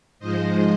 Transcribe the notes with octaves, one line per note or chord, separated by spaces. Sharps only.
G#2 F3 G#3 C5 D#5